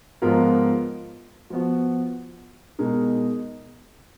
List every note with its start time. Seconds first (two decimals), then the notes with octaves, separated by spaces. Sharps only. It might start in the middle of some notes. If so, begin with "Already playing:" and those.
0.22 G#2 F3 B3 F4 A#4
1.50 F3 B3 F#4
2.79 B2 G#3 D#4 A#4